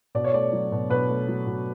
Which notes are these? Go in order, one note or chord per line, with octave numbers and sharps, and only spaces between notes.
B2 D5
C#5
A3 D5
F#3
B2
B2 B4
A3
F#3
B2